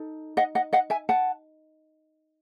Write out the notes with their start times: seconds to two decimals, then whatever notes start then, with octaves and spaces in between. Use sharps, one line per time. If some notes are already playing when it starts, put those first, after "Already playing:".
Already playing: D#4 A4
0.37 D#5 F#5
0.55 D#5 F#5
0.73 D#5 F#5
0.90 E5 G#5
1.09 F#5 A5